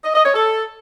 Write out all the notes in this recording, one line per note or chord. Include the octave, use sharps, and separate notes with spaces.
D#5
D#5
C#5
A4